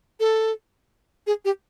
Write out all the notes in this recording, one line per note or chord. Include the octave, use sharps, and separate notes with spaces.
A4
G#4
G4